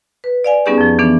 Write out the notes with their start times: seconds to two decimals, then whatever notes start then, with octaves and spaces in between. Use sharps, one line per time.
0.24 B4
0.44 D5 F5 G#5
0.66 G3 B3 C#4 D#4 G4 G#4
0.78 F2 F3
0.99 E3 B3 D4